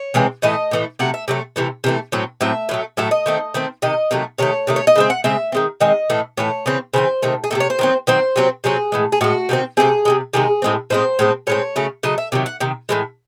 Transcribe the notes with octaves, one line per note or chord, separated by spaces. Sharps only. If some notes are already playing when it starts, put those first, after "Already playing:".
Already playing: C#5
C3 E3 G#3 C4
A2 E3 A3 D#5
A2 E3 A3
C3 F#3 A3 F#5
E5
C3 F#3 A3
C3 E3 A3
C3 E3 A3
A2 F#3 C4
A2 F#3 C4 E5
A2 F#3 A3
A2 F#3 A3 E5
D#5
D#3 A3 C4
D#3 A3 C4
C3 D#3 D#5
C3 D#3 F#3 A3
C3 D#3 A3 C#5
C3 D#3 A3
C#5
D#5
C#3 G#3 C4 E5
F#5
C#3 G#3 C4 E5
D#3 G#3 C4
D#3 G#3 C4 D#5
A2 E3 A3
A2 E3 A3 C#5
C#3 E3 C4
C#3 E3 C4 C5
C3 D#3 A3
G#4
C3 D#3 A3 A4
C#5
C5
D#3 F#3 C4
D#3 F#3 C4 C5
C3 F#3 C4
C3 F#3 C4 G#4
A2 E3 G#3
G#4
A2 E3 G#3 F#4
C3 D#3 A3 C4
C3 D#3 A3 C4 G#4
C3 D#3 G#3
C3 D#3 G#3 G#4
A2 G#3 C4
A2 G#3 C4 C5
A2 G#3 C4
A2 G#3 C4 C#5
C#3 F#3 A3
C#3 F#3 A3 D#5
E5
C3 D#3 F#3
F#5
C3 D#3
A2 E3 G#3